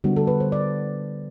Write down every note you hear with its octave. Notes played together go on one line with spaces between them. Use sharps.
D3 G3 B3 F#4
A4
B4
C5
D5